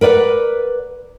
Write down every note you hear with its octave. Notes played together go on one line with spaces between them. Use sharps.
A#4 B4 D5 E5 F#5